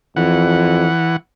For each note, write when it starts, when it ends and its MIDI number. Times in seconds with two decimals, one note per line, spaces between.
0.16 0.88 41
0.16 1.16 52
0.16 1.16 78